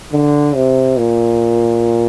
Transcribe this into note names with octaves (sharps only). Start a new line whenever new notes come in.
D3
C3
A#2